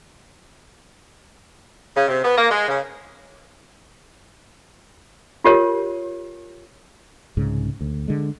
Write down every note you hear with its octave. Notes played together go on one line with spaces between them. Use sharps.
C#3
C3
B3
A#3
G#3
C#3
F4 G4 A#4 C#5
C2 G#2 C#3
D2
D3 G#3